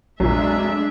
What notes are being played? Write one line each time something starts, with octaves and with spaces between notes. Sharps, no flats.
F1 A#1 G2 A#2 F#3 G#3 D4 E5